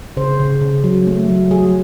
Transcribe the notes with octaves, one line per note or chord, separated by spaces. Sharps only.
C#3 C5
C#3
C#3
F#3
A3
F#3
F#3 G#4